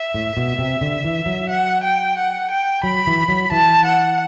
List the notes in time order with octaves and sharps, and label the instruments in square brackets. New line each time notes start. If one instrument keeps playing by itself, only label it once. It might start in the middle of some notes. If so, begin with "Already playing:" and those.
Already playing: [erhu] E5
[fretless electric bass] A2
B2
C3
D3
E3
F#3
[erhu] F#5
G5
F#5
G5
[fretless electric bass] F#3 [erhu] B5
[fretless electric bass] E3
F#3
[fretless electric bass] E3 [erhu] A5
[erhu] F#5